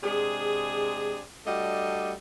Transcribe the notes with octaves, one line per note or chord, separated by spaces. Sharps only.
C3 G#3 D4 G#4
G3 A3 D4 F#4 D#5